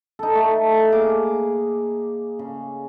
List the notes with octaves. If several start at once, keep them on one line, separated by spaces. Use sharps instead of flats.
D#4 A4
A3
A#3 G#4 D6
C#3